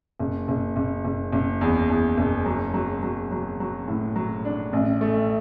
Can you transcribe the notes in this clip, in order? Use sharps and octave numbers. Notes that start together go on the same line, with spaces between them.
F#1
F#1
F#1
F#1
F#1
E2
E2
F#1
F#3
F#3
F#3
F#3
F#3
A2
F#3
D4
A1
A3